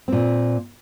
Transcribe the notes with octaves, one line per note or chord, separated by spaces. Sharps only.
A#2 C4